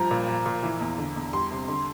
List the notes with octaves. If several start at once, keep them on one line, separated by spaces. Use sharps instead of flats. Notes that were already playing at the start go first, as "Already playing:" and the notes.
Already playing: G2 F3 A#5
A#2
F3
A#2
E3
E2
D3
E2
G3 C6
C3
D3